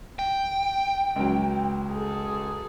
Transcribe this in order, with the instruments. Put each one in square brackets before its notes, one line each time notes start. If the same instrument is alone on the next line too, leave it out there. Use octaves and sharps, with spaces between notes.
[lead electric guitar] G5
[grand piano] C#2 F#3
[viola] G#4 A4